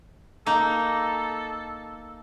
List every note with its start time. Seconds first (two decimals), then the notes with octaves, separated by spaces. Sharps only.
0.46 A#3 D#4 A4